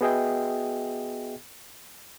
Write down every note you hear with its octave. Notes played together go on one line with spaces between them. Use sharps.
B3 F#4 G#4 D#5 E5 G5